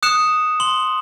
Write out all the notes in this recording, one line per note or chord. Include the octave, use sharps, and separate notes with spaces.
D#6 F#6 C#7 E7
C6 F#7